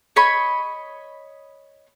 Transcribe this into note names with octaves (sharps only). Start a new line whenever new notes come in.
C#5 D#5 B5 C#6